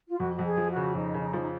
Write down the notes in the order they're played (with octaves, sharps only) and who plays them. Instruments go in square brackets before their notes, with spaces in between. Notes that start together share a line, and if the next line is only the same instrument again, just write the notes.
[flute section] F4
[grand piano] F2 [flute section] F#4
[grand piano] F2 [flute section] F#4
[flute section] G#4
[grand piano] F3
[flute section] F#4
[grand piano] C#3
[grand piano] F2 [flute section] D#4
[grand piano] C#3
[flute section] D#4
[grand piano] F3
[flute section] D#4